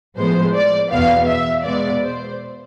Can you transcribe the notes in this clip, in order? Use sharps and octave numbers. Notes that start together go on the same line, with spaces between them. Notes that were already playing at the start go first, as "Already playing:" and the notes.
A2 F3 G#3 B3 C5
D5
E2 B2 B3 F5
E5
B2 G#3 B3 D5
C5